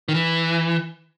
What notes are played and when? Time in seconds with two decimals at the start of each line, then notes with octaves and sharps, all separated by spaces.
0.09 D#3
0.14 E3